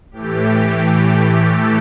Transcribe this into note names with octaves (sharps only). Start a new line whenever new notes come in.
A2 E3 A3 G4
G4
G4
G4
A4